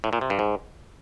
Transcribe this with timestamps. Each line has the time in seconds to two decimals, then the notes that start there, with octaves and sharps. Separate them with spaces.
0.04 A2
0.13 A#2
0.21 C3
0.30 G2
0.39 G#2